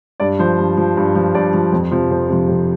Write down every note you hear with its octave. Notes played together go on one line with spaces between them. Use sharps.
G2 D5
F3 C5
G2
F3
G2
F3
G2 D5
F3
F2
C3 F3
F2 C5
C3 F3
F2